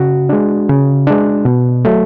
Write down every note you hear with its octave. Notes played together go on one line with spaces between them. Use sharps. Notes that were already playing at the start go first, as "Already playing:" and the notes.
Already playing: C#3 F#4
G#3 D4
C#3
G#3 D4
B2
F#3 A3